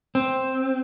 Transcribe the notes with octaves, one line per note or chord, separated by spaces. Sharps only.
C4